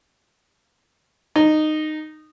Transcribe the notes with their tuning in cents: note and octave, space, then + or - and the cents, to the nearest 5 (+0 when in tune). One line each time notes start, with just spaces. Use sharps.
D#4 -15